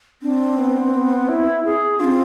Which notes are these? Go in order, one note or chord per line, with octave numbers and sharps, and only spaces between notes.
C4 D4
B3
B3
E4
G#4
C4 D4 F4